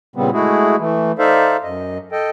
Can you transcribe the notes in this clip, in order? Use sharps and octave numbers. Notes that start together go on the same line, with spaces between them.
A#2 C#3 G3 B3 C4
G#3 A3 E4 F#4 G#4
E3 A3
D#4 A4 C5 D5 E5 F5
F#2 D#5
A4 D#5 G5